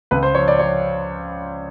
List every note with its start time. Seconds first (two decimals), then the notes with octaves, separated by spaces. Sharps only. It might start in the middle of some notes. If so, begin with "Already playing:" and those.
0.11 C#2 B4
0.23 C5
0.34 F3 C#5
0.48 D5
0.59 F3 C#5